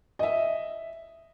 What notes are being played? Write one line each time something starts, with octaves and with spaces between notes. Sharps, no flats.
D#5 E5